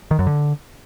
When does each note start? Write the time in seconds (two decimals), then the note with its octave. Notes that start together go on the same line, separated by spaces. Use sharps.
0.11 D#3
0.19 F#2
0.27 D3